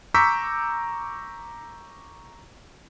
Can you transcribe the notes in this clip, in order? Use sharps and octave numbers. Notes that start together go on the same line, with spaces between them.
A#5 C#6 D6 E6 G6 B6